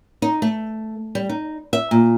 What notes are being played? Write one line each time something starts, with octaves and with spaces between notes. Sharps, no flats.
D#4
A3
G3
D#4
E5
A#2